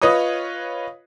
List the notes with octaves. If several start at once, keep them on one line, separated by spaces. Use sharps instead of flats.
F4 B4 C#5 D#5 D#6